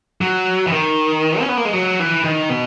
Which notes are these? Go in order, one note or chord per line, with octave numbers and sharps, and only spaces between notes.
F#3
E3
D#3
C#4
B3
A#3
G#3
F#3
E3
D#3
B2